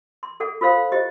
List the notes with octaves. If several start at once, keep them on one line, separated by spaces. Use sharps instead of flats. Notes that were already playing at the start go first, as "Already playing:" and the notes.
C6
G#4 A4 F#5
F4 A4 C5 F5 C6
E4 G4 C5 D#5